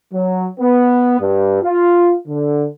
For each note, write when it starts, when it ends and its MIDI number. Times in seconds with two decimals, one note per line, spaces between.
0.14 0.47 54
0.60 1.17 59
1.20 1.60 43
1.63 2.13 65
2.27 2.66 50